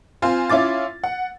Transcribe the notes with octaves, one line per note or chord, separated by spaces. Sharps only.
C4 F4 G#5
C#4 E4 F4 D6 A6
F#5